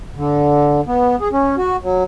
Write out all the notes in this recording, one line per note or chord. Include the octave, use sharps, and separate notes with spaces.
D3
B3
G#4
C#4
F#4
F#3